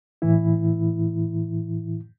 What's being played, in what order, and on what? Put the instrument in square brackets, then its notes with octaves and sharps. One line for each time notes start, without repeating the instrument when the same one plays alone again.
[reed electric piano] A2 E3 E4